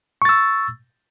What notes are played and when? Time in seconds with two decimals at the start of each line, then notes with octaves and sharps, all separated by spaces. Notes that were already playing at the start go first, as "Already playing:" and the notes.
0.22 C#6
0.25 A6
0.29 E6